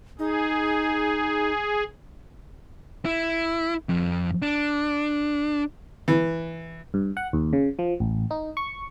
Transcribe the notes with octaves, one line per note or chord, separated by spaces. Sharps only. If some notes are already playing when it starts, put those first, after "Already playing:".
D#4 G#4
E4
F2
D4
E3
G2
F#5
D#2
C#3
F3
A1
D#4
C#6